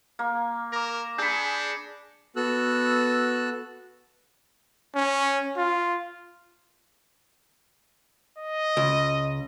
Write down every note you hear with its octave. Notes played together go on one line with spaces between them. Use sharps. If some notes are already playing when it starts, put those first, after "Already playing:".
A#3
A#4 D6 A#6
D4 G#4 B5 G6 C#7
B3 F#4 A4 E6 F#6
C#4
F4
D#5
C#2